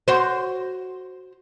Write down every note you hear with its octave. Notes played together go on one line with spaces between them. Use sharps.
F#4 C5